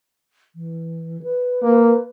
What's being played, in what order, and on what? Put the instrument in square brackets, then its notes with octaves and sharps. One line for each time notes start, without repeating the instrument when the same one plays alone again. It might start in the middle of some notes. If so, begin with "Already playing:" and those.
[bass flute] E3
B4
[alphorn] A#3